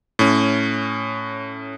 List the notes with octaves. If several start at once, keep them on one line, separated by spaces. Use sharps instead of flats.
A2 C#4